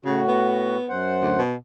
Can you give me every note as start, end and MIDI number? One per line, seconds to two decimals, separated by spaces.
0.05 0.77 45
0.05 0.22 49
0.05 0.77 66
0.28 0.93 59
0.89 1.40 42
0.89 1.40 72
0.89 1.40 78
1.22 1.35 38
1.39 1.55 47